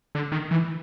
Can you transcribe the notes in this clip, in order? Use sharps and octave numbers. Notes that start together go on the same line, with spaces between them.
D3
D#3
E3